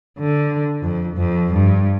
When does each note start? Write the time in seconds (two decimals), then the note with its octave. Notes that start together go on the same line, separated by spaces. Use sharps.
0.19 D3
0.82 F2
1.17 F2
1.54 G2